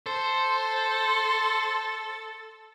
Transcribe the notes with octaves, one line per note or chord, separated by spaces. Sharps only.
A4 C5